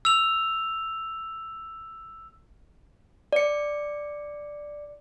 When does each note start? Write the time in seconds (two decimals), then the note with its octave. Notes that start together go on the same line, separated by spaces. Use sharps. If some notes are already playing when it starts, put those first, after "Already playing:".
0.05 E6 F7
3.33 D5 C#7